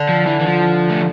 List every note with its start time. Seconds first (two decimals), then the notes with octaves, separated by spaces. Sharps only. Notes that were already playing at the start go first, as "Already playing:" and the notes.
Already playing: D3
0.09 F3
0.27 E3
0.40 E3
0.46 F3
0.90 A3